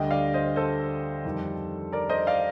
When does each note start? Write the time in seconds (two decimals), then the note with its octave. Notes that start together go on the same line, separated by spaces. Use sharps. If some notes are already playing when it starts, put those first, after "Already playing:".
Already playing: D2 D3 G3 D#5 G5
0.11 D5 F5
0.34 C5 D#5
0.56 A4 C5
1.25 F2 D#3 G3
1.92 A#4 D5
2.10 C5 D#5
2.27 D5 F5